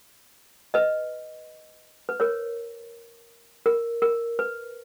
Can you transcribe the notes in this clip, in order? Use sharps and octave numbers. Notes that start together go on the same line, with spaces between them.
B4 D#5
B4
A#4 C#5
A#4
A#4
B4